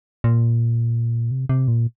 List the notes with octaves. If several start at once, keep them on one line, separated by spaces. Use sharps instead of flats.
A#2
C3
C3
A#2